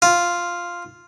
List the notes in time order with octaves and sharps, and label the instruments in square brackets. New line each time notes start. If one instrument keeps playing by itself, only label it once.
[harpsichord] F4